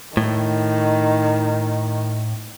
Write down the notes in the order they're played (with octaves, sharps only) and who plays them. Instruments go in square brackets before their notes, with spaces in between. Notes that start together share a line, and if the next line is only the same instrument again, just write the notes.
[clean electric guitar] A2 [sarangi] D#3